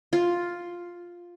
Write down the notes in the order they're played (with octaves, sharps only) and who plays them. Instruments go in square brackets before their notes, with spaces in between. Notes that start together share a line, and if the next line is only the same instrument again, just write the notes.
[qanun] F4